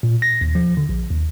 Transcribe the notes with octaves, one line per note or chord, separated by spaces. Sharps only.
A#2
A#6
D#2
F3
D3
A#1
D#2